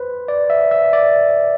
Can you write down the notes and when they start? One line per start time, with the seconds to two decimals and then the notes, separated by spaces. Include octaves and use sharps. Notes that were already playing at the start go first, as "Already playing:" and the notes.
Already playing: B4 C5
0.28 D5
0.50 E5
0.71 E5
0.93 D5